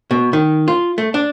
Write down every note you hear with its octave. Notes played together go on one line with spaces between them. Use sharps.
B2
D#3
F4
A3
D4